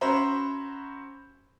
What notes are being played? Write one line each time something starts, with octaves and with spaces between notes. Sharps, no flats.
C#4 F#4 C5 E5 A#5 B5